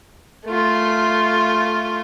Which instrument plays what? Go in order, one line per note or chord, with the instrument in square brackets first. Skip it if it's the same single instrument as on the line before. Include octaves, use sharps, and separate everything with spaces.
[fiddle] A3 F4